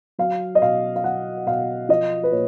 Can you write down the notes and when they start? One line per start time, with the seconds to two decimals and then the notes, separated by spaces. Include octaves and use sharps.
0.18 F#3 F5
0.55 D#5
0.61 B2 F5
0.96 F5
1.04 F#3 F#5
1.47 B2 F5
1.89 F3 D#5
2.23 B4
2.32 A#2 C#5